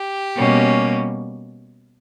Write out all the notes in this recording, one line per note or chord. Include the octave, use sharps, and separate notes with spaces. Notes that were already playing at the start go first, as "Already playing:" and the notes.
Already playing: G4
B2 G3 A#3 C#4